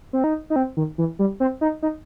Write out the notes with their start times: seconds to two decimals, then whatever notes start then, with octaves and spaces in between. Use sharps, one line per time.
0.13 C4
0.24 D#4
0.50 D#4
0.56 C4
0.77 D#3
0.98 E3
1.19 G3
1.40 C4
1.61 D#4
1.82 D#4